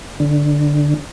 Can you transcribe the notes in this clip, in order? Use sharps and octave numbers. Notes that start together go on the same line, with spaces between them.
D3